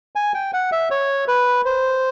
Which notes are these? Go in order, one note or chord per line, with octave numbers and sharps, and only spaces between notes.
G#5
G5
F#5
E5
C#5
B4
C5